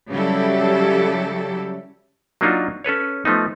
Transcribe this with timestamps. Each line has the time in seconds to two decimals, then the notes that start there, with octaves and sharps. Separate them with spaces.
0.11 C#3 F#3 G3 E4 G4 A4
2.41 F#3 A#3 D4 D#4 F4 F#4
2.84 C#4 A4 B4 C#5
3.25 F3 A3 B3 D#4